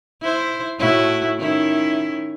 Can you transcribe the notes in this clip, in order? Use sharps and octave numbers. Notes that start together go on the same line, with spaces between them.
E4 C5
A2 E4 F#4
D#3 C#4 E4